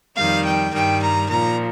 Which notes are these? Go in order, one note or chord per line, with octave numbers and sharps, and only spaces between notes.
F2 D#3 G3 F5
G5
G2 D#3 G3 G5
A#5
A#2 F3 A#5